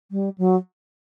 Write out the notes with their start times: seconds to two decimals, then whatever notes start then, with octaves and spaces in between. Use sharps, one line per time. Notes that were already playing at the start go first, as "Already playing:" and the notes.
0.11 G3
0.38 F#3